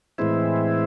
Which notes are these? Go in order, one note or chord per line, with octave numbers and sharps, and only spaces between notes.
A2 E3 G#3 C4 E4